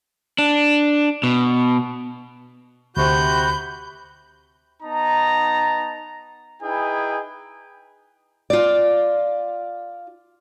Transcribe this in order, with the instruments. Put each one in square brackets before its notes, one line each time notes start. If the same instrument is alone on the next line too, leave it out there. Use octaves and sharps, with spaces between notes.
[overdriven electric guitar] D4
B2
[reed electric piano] D2 [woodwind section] C3 F#4 [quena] B5 [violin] G6
[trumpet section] B3 D#4 A5 A#5
D#4 E4 G#4 B4 G5 G#5
[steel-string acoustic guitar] F4 D5